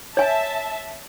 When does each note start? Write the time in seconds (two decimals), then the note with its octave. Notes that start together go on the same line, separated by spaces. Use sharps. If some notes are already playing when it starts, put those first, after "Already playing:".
0.17 C#5 E5 G#5 A5